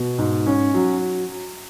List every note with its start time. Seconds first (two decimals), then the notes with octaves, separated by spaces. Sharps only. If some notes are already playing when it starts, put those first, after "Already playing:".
Already playing: B2
0.18 G#2
0.47 C#4
0.74 F#3